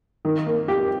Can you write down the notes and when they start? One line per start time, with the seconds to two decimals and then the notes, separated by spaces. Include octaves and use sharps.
0.25 D#3
0.47 A#3
0.68 G4